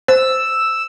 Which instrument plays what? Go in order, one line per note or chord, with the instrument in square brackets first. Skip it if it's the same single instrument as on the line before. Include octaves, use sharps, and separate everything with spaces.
[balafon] C5 [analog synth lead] E6